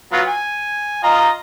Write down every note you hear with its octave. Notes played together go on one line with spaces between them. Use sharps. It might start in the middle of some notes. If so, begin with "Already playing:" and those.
F#3 B3 F4
G#5
F4 D#5 A#5